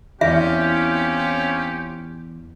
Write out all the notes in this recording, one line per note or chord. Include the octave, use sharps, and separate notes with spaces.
E2 C4 C#4 E4 F4 G4 D5 E5